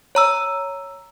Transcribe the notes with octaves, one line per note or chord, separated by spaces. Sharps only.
C#5 A#5 E6